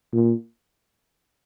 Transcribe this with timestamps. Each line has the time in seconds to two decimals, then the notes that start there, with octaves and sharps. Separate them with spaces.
0.13 A#2